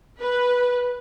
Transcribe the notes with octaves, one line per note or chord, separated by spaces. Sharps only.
B4